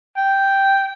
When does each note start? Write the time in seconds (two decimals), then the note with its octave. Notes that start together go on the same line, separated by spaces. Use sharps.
0.17 G5